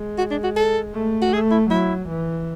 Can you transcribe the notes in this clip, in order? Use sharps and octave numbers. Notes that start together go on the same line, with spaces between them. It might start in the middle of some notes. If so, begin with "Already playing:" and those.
Already playing: G#3
F#4
D4
F#4
A4
A3
F#4
A3 G#4
E4
F#3 E4
E3